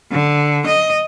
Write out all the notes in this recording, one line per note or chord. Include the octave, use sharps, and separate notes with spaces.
D3
D#5